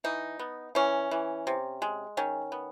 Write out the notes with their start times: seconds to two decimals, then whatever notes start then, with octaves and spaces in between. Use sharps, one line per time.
0.04 E3 D#4
0.39 B3
0.75 E3 C#4
1.11 E3
1.47 C3
1.82 G#3
2.17 D#3 C#4
2.52 B3